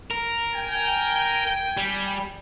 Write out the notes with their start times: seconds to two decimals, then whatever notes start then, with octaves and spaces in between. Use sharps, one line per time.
0.11 A#4
0.54 G5 G#5
1.77 G3